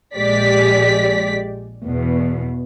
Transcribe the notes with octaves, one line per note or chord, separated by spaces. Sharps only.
A#1 G#3 G4 D5 B6
E2 B2